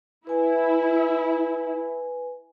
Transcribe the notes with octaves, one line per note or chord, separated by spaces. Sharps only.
E4 B4 G#5